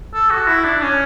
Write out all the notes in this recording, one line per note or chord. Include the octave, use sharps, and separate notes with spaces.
A4
F#4
E4
D4
C#4